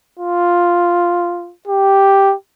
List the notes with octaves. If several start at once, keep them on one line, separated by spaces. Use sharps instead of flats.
F4
G4